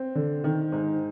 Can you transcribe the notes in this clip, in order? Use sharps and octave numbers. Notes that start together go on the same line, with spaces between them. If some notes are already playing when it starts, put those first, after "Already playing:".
Already playing: C4
D3
D#3
G#2